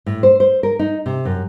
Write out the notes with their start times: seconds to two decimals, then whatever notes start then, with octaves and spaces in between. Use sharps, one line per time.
0.06 A2
0.23 C5
0.40 C5
0.63 A#4
0.79 D#4
1.06 C3
1.25 F#2